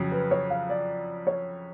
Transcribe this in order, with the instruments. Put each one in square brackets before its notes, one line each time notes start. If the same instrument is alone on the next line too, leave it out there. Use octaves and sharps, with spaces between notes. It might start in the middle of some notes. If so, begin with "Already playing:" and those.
Already playing: [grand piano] F2 C#3 F#3
[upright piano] B4
C#5
F5
D5
C#5